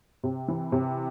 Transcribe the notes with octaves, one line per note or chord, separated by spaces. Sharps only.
C3
E3
C3